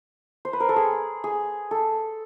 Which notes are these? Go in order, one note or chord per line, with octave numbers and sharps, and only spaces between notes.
C5
B4
A#4
A4
G#4
G#4
A4